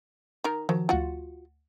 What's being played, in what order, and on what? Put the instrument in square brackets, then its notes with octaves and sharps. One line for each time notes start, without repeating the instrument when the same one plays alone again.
[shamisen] D#3 A#4 [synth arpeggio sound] A#5
[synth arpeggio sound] D#3 F3 [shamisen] F#3
[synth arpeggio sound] D2 F#5 [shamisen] F4 F#4